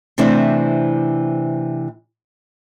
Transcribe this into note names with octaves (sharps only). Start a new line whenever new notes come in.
C3 E3 A3 C4 D4 E4